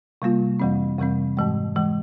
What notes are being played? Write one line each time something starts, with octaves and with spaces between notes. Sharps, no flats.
C3 G3 A#3 F4
F2 C3 E3 G3 C4
F2 C3 E3 G3 C4
G#2 E3 G#3
E3 G#3